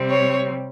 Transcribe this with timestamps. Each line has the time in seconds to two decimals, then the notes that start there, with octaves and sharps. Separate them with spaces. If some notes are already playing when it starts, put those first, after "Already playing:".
Already playing: C3 G3 C4
0.11 C#5